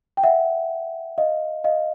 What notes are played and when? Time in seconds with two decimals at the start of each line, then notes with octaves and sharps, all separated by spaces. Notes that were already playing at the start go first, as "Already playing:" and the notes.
0.17 G5
0.23 E5 F#5
1.18 D#5 F5
1.64 D#5 F5